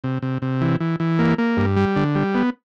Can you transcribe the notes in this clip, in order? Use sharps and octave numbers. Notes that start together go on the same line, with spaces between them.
C3
C3
C3
E3
E3
E3
A#3
A#3
G2
G3
D3
G3
B3